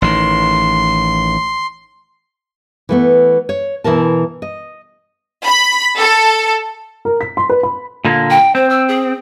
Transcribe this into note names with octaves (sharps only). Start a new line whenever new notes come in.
A1 D#3 C6
E3 A3 B3
C#5
B2 E3 E4 A#4 A5
D#5
B5
A4
A#4
B6
C6
B4
B5
A#2 D3 A#3
G5
C4 C5
E6
G#4